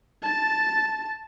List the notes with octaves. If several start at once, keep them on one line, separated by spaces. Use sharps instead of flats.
A5 A6